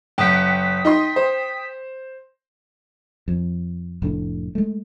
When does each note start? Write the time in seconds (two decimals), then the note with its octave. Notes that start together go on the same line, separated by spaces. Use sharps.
0.18 F#1 F#5 G5 D#6 B6
0.85 D#4 D#5 C6
1.16 C5
3.28 F2
4.02 F1 A2 D4
4.55 G#3 A3